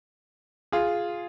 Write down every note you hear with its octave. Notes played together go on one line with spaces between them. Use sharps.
F4 G#4